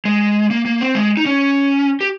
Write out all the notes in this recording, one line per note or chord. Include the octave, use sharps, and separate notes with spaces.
G#3
A#3
A#3
C4
G#3
D#4
C#4
G4